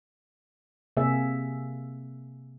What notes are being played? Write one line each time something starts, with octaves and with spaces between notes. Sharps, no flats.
C3 A#3 G#4 E5